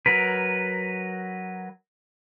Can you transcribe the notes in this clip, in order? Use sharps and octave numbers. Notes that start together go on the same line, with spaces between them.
F#3 A#4 B4